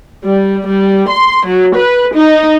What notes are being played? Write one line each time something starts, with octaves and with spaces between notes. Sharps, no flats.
G3
G3
C6
F#3
B4
D#4